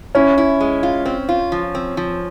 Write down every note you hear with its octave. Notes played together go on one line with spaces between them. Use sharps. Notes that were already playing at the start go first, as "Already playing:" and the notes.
C#4 E4
E4
G#3
F4
C4
F4
F3
C4
F3